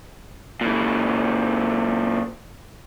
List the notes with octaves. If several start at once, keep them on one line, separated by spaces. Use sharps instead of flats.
A#2 E3